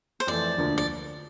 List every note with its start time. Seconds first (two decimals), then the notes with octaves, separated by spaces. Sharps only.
0.20 C5
0.27 F2 E3 A3 D5
0.56 E1 D2 D3 F3 A#3
0.78 D5